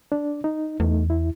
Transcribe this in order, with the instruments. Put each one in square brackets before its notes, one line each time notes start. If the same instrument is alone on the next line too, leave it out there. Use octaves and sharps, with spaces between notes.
[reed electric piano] D4 D5
D#4
[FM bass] E2 [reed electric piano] A3 D#4
[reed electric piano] E4